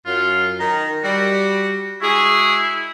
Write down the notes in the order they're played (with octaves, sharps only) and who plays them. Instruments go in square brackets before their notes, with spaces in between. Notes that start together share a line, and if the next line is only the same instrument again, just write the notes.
[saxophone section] F#2 [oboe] F4
[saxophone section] D#3 [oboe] A#5
[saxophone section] G3 [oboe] F#4
[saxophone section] G#3 F#4 G#4 [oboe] E4